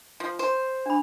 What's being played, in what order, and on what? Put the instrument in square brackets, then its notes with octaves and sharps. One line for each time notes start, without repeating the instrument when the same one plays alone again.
[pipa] F3
C5
[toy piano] D4 B5